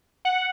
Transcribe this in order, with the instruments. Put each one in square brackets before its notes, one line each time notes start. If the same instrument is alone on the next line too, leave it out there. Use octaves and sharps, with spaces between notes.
[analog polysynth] F#5